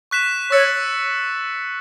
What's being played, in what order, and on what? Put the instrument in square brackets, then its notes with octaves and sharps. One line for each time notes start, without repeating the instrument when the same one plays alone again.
[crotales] C#6 F#6 B6 E7
[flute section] C#5 [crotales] C#6 E6 A6 C#7